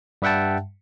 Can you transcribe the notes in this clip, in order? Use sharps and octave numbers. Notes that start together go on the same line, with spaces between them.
G2 G3 E5 F#5 G5 A5